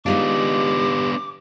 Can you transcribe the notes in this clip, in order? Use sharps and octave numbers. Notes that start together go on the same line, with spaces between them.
G#3 B3 D4 D#4 F4 G4 D6